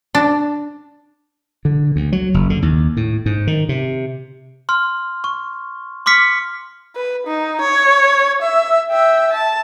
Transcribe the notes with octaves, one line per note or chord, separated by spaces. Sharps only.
D4
D3
D2
F#3
F#1
D3
D#2
A2
G#2
D#3
C3
C6 F6
C#6
C6 D6 F6 B6 C#7
B4
D#4
C#5
E5
E5 G5
A5